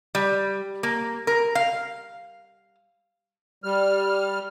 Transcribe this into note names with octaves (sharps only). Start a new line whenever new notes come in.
G3
A#3
A#4
F5
G3 F6